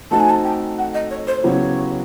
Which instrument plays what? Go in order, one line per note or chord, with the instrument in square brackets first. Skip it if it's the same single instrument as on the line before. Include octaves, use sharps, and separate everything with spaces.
[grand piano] A3 C4 D#4 F#4 A4 [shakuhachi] A5
[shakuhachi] G#5
A5
G5
F#5
D#5
C#5
C5
[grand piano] C#3 F#3 B3 E4 G4 [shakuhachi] C#5